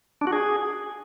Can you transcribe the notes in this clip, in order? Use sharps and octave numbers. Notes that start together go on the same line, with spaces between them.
D4
F#4
G#4